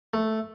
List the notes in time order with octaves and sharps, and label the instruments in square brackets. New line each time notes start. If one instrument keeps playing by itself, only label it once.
[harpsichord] A3